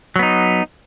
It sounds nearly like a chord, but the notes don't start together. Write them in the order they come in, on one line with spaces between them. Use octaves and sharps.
F#3 B3 D#4